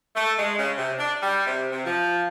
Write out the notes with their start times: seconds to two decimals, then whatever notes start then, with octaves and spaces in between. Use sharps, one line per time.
0.15 A3
0.37 G#3
0.57 C#3
0.77 C3
0.98 D4
1.21 G3
1.46 C3
1.71 C3
1.84 F3